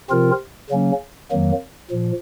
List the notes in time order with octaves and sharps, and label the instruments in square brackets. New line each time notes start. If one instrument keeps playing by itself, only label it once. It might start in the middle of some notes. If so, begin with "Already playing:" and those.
[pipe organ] C3 F3 C4 F4 A#4
C#3 F#3 A#3 C#4
F2 D#3 F#3 A#3
A#2 F3